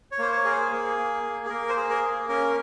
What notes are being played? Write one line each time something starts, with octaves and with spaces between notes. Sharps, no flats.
C#5
A#3 C5
C#5
G#4 A#4
C5
A#3 G#4
A#3
A#3
G#4
A#3 A#4
C5
G#4
A#4
A#3
C#4 A#4